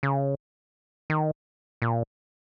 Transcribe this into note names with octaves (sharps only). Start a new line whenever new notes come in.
C#3
D#3
A#2